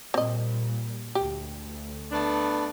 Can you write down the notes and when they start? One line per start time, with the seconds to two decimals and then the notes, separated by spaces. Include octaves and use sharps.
0.14 A#2 G3 C4 D#5
1.15 D2 G4
2.12 A3 B3 D4